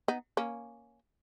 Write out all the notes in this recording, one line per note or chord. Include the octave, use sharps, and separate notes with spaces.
B3 D#4
A#3 C#4